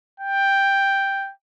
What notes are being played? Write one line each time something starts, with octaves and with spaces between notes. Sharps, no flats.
G5